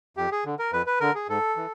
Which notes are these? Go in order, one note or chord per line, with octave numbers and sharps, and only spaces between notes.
F2 G4
G#4
D3
A#4
F2 B4
B4
D3 A#4
G#4
G#2 A4
E3